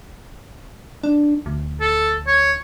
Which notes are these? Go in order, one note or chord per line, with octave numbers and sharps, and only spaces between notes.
D4
D2
A4
C#5